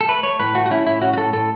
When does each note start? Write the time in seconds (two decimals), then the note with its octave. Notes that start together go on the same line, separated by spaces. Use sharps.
0.01 A4
0.08 A3 B4
0.23 A3 C#5
0.40 A2 B4
0.55 A3 F#4
0.66 F#4
0.71 C#4 E4
0.87 A2 E4
1.02 C#4 F#4
1.13 F#4
1.18 A2 A4
1.33 A2 A4